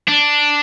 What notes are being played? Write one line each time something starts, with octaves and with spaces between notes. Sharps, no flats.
D4